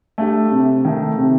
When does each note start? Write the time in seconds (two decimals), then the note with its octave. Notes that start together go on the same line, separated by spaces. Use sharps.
0.18 A3 D4 G4
0.51 C3
0.85 D#3 A3
1.17 C3